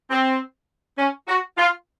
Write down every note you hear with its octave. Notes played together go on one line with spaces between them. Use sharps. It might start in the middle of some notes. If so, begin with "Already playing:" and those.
C4
C#4
F#4
F4